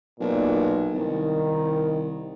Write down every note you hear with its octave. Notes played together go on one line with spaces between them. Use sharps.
B1 A#2
C2 D#3